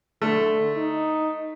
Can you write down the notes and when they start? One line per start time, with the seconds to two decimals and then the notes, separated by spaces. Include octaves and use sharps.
0.22 D3 A3
0.77 D#4